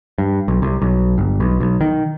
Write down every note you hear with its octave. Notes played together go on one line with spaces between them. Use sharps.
G2
B1
C2
B1
G1
B1
B1
D#3